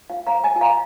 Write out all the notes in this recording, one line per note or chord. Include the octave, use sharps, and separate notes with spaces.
F4 F5
F5 A#5
C5
D#5 G#5
F4 G#5
F5 A#5